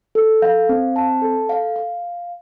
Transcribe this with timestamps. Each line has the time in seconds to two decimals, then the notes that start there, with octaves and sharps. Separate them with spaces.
0.15 A4
0.42 F5
0.69 C4
0.96 A5
1.22 A4
1.49 F5
1.76 F5